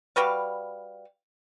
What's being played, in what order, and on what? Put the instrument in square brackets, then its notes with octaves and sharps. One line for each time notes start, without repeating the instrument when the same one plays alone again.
[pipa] G3 F#4 B4 F5